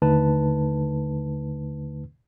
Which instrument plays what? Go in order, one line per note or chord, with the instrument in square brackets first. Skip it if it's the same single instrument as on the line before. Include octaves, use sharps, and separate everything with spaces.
[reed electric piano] D#2 D3 A3 D#4 B4 A5